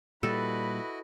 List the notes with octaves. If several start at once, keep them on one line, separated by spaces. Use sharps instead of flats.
A#2 G3 E4 F#4 A4 B4 D#5